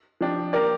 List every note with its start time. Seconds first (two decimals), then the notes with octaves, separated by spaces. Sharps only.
0.21 F3 D4 G4
0.53 A#3 G4 A#4 D5